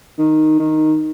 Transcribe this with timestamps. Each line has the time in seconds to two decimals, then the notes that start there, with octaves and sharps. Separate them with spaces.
0.18 D#3
0.59 D#3